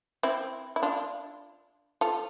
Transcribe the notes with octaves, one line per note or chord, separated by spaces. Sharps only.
C4 E4
E4
D4 F4
F4 A4